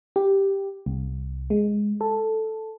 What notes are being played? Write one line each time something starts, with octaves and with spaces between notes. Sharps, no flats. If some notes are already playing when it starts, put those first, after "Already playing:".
G4
C2
G#3
A4